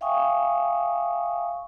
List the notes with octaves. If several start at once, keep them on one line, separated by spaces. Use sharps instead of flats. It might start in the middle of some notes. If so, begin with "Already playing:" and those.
E5 F5 G5 G#5 C#6 D#6